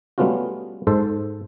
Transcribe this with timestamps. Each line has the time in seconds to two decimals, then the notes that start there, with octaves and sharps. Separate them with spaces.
0.18 G3 A3 B3 C#4 F4 F#4
0.87 G#2 A4 C5